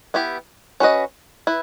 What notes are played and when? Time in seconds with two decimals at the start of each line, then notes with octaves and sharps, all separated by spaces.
0.14 B3 E4 G4
0.80 C#4 F#4 B4 D#5
1.47 E4 B4